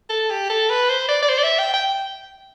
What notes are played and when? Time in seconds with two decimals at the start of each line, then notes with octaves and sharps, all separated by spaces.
0.10 A4
0.30 G4
0.50 A4
0.70 B4
0.89 C5
1.09 D5
1.22 D5
1.29 C5
1.39 D5
1.43 E5
1.59 G5
1.74 G5